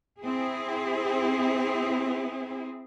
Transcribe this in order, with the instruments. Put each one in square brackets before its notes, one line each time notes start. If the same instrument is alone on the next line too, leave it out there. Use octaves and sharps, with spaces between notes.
[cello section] C4 E4 G#4